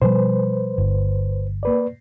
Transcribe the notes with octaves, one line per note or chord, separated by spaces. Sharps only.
B2 F3 G3 B4 C5
G1
A#3 B4 D5